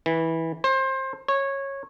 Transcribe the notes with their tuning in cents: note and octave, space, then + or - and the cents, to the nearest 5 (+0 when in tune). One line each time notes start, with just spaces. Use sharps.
E3 -15
C5 +25
C#5 -15